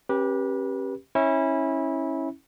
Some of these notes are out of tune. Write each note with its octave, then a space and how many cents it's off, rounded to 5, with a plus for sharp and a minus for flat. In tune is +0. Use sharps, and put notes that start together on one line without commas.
C#4 -35 G4 +0 B4 -30
C#4 -20 E4 -20